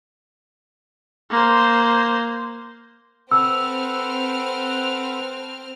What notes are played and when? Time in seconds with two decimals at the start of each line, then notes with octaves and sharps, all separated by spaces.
1.31 A#3 C5
3.32 C4 A4 B4 F#5 E6 F6